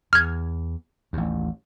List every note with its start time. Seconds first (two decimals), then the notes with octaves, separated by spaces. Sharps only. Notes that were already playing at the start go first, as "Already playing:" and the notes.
0.13 E2 F6 G#6
1.13 A1 D#2